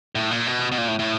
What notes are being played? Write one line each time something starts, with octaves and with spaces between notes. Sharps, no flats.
A2
A#2
B2
B2
A#2
A2
A2